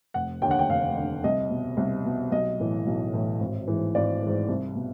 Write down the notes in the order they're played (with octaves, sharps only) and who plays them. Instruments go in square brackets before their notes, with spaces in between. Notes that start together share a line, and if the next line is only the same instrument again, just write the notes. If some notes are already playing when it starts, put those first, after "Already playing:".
[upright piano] F1 F#5
D#2 D3 G5
F#5
G5
F1 F5
D#2 D3
C2 D#5
B2
C2
B2
B1 D#5
A2 E3
B1
A2 E3
G#1
G#2 E3
G#1 D5
G#2 E3
C2
B2